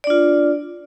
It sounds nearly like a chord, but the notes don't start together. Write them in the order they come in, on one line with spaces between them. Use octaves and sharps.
D5 D4 F4